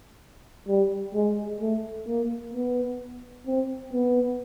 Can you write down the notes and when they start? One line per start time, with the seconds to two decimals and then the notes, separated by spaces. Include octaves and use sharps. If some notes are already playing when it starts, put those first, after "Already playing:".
0.68 G3
1.14 G#3
1.61 A3
2.07 A#3
2.53 B3
3.47 C4
3.93 B3